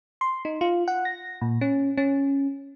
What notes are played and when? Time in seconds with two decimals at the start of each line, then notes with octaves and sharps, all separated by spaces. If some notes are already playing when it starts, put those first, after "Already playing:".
0.21 C6
0.45 D#4
0.61 F4
0.88 F#5
1.05 A#6
1.41 A#2
1.61 C#4
1.97 C#4